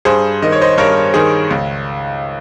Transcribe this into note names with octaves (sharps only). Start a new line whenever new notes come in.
G2 G#4 C5
D#3 D#5
C#5
C5 D#5
G2 A#4 C#5
D#3 G#4 C5
C#2